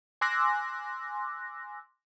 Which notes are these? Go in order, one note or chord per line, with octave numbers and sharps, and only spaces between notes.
G#5 C6 D6 E6 F#6 A#6